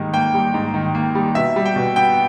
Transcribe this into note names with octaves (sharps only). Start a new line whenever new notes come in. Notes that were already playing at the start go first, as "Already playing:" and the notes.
Already playing: G#2 D#3 G3 A#3
A#3 G5
G3
G#2
D#3
A#3
G3
B2 E5
G3
G5
B2
B3 G5